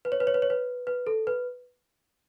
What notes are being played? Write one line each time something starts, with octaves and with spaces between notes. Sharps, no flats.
B4
C#5
B4
C#5
B4
C#5
B4
B4
A4
B4